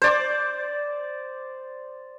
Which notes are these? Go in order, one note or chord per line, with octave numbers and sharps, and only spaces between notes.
C5 D5 D6